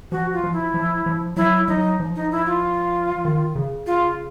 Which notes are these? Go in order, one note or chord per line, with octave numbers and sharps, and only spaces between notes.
F3 F#4
F4
F3
E4
F3
F3
F#3 E4
F#3 D#4
F3
D#4
E4
F4
D#3
C#3
F4